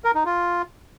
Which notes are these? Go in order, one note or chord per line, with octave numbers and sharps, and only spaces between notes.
A#4
D#4
F4